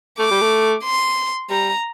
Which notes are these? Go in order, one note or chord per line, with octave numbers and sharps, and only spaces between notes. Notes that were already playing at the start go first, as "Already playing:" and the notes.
A3 D6
G3
A3
C6
G3 A#5